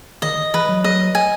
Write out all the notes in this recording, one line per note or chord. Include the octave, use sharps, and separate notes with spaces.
D#3 D#5
E3 B4
F#3
D#5
G#5